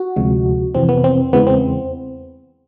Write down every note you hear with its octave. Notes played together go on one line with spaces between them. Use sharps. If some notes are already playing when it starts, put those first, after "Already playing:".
Already playing: F#4
D2 C3 F3 G#3
F2 C3 E3 C4
B3
C4
E2 C#3 E3 G#3 B3
C4